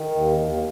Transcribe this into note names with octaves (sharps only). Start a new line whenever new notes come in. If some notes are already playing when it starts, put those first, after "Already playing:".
Already playing: D#3
D#2
D#2